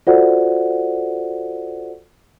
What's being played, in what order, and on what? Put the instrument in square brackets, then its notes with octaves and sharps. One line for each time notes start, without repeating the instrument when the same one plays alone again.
[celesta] F4 F#4 A4 C5 D5 F#5